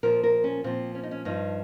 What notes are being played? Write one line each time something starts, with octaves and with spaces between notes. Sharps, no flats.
A#2 F3 A#4
A#4
C#4
A#2 F3 C4
C#4
D#4
C#4
G2 F3 D#4